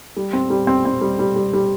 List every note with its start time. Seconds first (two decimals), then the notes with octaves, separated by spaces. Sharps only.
0.17 G3
0.33 C4
0.50 G3
0.67 C4
0.85 C4
1.01 G3
1.19 G3
1.36 G3
1.53 G3